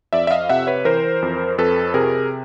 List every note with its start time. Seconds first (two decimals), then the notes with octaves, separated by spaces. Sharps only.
0.13 F2 D5 E5
0.27 E5
0.31 D#5 F5
0.49 C3 E5 F#5
0.67 B4 C#5
0.85 E3 A#4 C5
1.22 F2
1.58 F2 A4 B4
1.94 C3 G#4 A#4